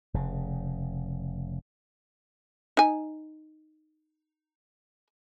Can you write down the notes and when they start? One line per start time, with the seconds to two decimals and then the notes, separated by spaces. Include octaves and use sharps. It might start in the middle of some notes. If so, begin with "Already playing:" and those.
0.14 F1 C#3
2.77 D#4 G#5